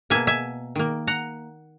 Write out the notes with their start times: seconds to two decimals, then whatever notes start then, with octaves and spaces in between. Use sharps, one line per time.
0.10 B2 A#3 E5 G#5
0.27 E5 G#5
0.75 D#3 A#3
1.07 F#5 A#5